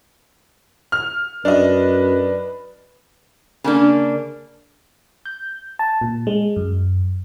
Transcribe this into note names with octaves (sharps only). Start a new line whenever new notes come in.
F6
F#2 D4 B4 D#5
C#3 A#3 D4
G6
A5
A#2
G#3
F#2